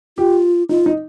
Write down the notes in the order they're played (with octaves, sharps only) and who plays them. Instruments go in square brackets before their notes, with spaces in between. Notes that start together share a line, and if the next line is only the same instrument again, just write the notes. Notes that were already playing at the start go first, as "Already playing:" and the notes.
[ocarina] F4 [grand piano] G4
[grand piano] D#4 [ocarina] F4
[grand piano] D#4